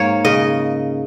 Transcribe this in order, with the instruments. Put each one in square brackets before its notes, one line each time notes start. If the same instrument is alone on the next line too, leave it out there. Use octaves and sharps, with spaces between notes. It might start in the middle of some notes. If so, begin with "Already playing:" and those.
Already playing: [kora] G#2 A#3 C#5
C#3 D#5